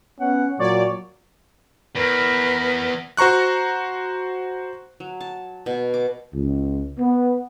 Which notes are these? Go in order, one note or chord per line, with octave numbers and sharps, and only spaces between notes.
B3 C#4 F#5
A#2 F#3 C#5 D5
E2 A#4 B4
F#4 C5 A#5 C#6 F#6
F#3
A5
B2
D6
C#2
B3